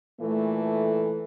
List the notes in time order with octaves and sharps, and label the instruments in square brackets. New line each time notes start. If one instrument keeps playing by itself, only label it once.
[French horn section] A#2 E3 A3